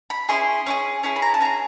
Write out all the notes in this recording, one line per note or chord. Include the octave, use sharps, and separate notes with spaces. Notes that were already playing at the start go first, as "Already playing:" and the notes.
B5
C#4 E4 G#4 C6
C#4 E4 G#4
C#4 E4 G#4
B5
A#5
A5
C#4 E4 G#4 A#5